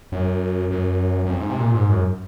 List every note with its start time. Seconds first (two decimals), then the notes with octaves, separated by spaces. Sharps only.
0.12 F#2
0.71 F#2
1.26 F#2
1.29 F2
1.40 G#2
1.50 C3
1.59 A#2
1.74 G#2
1.89 F#2